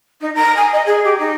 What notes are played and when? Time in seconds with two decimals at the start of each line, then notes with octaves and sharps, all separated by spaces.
0.20 D#4
0.34 A#5
0.56 G#5
0.72 D#5
0.86 G#4
1.04 G4
1.18 D#4